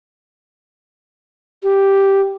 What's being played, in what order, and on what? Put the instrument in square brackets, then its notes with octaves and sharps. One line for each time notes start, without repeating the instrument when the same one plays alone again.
[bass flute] G4